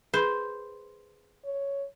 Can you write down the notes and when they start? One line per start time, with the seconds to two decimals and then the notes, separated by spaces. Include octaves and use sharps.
0.14 G#4 B4 C5 B5
1.45 C#5